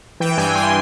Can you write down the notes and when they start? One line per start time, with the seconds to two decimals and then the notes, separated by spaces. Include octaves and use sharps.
0.20 E3 G5
0.37 G2 G#5
0.55 G2 C6